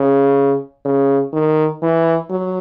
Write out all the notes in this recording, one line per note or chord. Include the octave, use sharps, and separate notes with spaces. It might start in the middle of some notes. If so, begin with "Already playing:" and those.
Already playing: C#3
C#3
D#3
E3
F#3